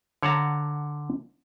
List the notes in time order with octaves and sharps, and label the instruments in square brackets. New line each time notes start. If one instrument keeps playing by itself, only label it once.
[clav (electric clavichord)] D3 C#5 F5 F#5 A5 A#5